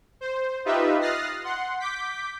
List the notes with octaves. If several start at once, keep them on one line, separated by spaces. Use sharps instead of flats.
C5
D#4 F4 G4 B4 D#5 E5
D#6 F6 F#6 A6 A#6 C7
F#5 C6
D6 G6 B6